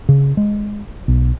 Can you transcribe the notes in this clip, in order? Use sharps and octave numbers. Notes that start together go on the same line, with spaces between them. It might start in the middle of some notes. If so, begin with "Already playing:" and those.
C#3
G#3
B1